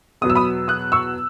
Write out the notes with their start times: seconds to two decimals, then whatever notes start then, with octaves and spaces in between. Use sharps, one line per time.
0.21 E2 B2 F#3 B3 D#6
0.30 E6
0.35 B5 D#6
0.68 D#6 F#6
0.92 C#6 E6